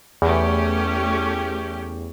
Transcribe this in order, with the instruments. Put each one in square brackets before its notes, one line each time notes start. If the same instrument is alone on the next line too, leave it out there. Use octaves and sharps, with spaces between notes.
[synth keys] E2 [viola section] A3 C#4 G4